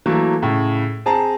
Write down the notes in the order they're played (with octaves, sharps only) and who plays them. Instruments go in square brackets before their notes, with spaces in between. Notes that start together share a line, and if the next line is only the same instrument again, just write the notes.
[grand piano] E3 F#3 A3 A#3
A2 C#3
C4 G#4 A5 A#5